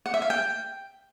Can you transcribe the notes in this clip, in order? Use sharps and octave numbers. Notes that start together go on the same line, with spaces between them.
F#5
E5
F5
G5